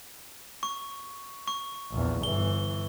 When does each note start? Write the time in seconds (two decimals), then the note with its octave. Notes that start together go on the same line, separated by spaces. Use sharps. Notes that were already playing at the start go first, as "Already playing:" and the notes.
0.63 C#6
1.48 C#6
1.92 A#1 E2
2.23 G1 E3 G7